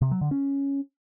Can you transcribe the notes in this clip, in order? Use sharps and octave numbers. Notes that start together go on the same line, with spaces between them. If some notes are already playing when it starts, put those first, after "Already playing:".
C3
F#3
D3
C#4